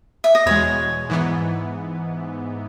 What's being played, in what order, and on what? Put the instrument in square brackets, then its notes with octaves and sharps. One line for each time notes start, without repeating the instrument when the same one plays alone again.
[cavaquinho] E5
D#5
[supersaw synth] E2 B2 G#3 [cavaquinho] C#5
[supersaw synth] G#2 E3 B3